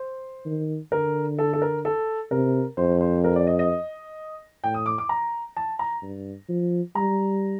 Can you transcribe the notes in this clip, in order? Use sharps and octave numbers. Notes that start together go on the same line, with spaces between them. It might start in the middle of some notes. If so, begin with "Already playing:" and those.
Already playing: C5
D#3
D3 A#4
A4
A4
A#4
A4
C3 A#4
F2 C5
C5
A#4
D5
D#5
D#5
A2 G5
D#6
D6
D6
A#5
A5
A#5
G2
F3
G3 A#5